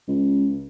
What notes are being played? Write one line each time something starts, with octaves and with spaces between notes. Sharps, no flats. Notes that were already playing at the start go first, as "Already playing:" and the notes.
C#2